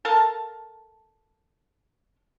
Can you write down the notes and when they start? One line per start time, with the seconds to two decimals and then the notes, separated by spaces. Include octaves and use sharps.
0.05 A4 A#4 F5 A5